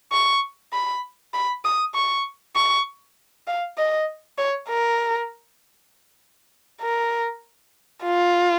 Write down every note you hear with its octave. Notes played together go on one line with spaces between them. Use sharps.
C#6
B5
B5
D#6
C#6
C#6
F5
D#5
C#5
A#4
A#4
F4